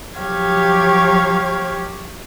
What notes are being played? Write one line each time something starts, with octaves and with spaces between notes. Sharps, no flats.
F3 F#3 G4 C#5 F5 G#6